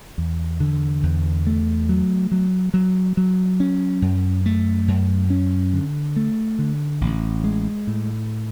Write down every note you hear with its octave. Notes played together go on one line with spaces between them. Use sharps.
E2
D3
E2
A3
F#3
F#3
F#3
F#3
C#4
F#2
A3
F#2
C#4
D3
A3
D3
A1
G#3
A2